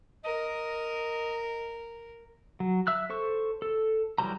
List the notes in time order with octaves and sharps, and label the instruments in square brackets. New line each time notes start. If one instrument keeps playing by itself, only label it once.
[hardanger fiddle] A#4 [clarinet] D#5
[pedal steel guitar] F#3
E5 E6 F#6
A4 C5 C#6
A4
E3 F#3 G3 C5 A#5